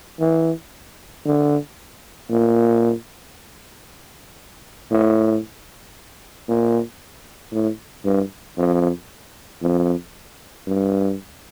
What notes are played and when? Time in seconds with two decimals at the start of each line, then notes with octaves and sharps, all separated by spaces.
0.20 E3
1.25 D3
2.30 A#2
4.91 A2
6.48 A#2
7.53 A2
8.05 G2
8.57 F2
9.62 F2
10.67 G2